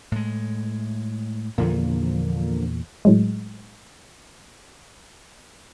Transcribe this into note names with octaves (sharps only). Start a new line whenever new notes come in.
A2 G#3
E2 A#2 D3 F3 A#3
A2 F#3 G#3